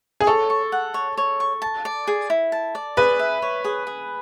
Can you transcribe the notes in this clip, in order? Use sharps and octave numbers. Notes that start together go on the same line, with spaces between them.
G#4
A4 C#5
C#6
F#5
C#5
C#5
C#6
A5
D5
G#4
E4
A5
D5
G#4 B4
E5
C#5
G#4
G#4